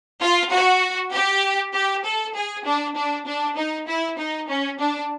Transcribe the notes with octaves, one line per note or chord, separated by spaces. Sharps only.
F4
F#4
G4
G4
A4
G#4
D4
D4
D4
D#4
E4
D#4
C#4
D4